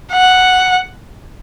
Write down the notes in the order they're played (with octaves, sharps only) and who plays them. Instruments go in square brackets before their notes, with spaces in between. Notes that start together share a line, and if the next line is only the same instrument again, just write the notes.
[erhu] F#5